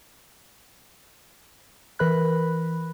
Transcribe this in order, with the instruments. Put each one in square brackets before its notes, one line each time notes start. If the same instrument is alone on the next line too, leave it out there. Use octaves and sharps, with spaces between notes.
[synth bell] E3 A#4 B4 B5 F#6